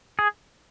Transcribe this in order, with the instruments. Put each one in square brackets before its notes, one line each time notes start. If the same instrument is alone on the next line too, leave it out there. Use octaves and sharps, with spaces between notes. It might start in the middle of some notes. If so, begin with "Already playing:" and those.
[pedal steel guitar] G#4